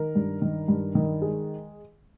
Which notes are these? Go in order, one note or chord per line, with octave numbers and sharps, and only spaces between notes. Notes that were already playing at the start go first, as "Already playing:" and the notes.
Already playing: D#3 A#4
G2
D#3
G2
D#3
G#3